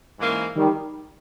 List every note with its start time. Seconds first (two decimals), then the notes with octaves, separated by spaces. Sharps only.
0.19 G#2 E3 A#3 C#4 E4
0.56 D#3 G3